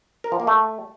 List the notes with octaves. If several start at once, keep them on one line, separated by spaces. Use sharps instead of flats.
A#4
F3
A#3
A3